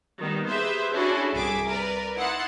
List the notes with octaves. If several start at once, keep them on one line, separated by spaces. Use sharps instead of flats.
D#3 G3 A#3 B3
G4 G#4 B4 C5 E5 E6
C#4 D4 E4 F#4 G#4 A4
C2 G#4 E5 D6
A#4 B4 D5
D#4 E4 F#5 C6 A6